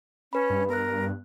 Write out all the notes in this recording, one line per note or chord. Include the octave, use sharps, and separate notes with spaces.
C#4 B4 B5
G2
B3 A#4 F#6